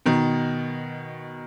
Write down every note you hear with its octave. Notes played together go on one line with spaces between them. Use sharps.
B2 D#3